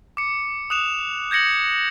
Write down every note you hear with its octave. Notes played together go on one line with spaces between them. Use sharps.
D6 C#7
D#6 F#6 E7 F7
G6 G#6 A#6 C#7 F#7